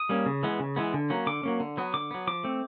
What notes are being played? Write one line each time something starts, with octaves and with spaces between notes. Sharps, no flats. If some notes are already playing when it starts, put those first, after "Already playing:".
Already playing: D#6
G3 A#3 C#4
C#3
E3 G#3 B3
C#3
E3 G#3 B3
D3
F#3 A#3 C#4
D3 D6
F#3 A#3 C#4
D3
F#3 B3
D3 D6
F#3 B3
F3 D6
A3 C4